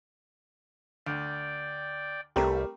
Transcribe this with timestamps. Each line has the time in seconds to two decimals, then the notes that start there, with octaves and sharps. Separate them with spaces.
1.06 D2 D5 G5
2.36 C2 G3 A3 C4 G4 A#4